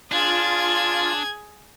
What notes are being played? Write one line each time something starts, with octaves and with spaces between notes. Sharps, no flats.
D4 F4 G#4 G#6